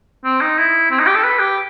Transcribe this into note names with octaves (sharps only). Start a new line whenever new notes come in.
C4
D#4
E4
C4
D#4
G4
A4
B4
G4